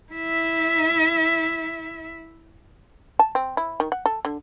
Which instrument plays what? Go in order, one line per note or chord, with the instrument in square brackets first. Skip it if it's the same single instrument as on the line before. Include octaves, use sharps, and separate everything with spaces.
[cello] E4 E5
[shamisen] A5
C4
E4
D#3
F#5
A4
D3